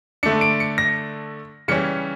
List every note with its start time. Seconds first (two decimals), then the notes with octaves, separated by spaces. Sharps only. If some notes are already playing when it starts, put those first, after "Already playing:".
0.23 D3 A3 D4 C#7
0.41 D7
0.60 C#7
0.78 A#6
1.68 C#3 E3 G3 C#4 C#7